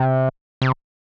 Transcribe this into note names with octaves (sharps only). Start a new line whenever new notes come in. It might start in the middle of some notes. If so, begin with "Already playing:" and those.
Already playing: C3
C3